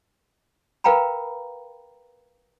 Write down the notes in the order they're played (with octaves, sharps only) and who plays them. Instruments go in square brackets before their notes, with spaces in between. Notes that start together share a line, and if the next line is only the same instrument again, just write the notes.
[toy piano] A#4 B4 F5 G5 A#5 B5